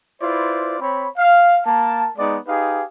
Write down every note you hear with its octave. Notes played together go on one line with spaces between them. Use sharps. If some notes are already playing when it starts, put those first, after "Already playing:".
E4 F4 B4 C5 D5
C4 C#5 B5
F5
A#3 A#4 A5
G#3 B3 D#4 D5
D#4 G4 G#4 B4 F5